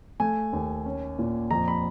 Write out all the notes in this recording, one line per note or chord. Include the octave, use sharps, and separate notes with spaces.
A3 G#5
D#2
C#4
A#2
F2 A#5
B5